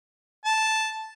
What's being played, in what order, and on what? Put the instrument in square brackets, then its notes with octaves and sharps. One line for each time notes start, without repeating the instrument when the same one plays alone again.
[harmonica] A5